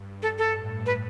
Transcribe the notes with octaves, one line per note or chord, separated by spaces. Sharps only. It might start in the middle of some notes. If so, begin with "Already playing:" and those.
Already playing: G2
A4
A4
A2
B4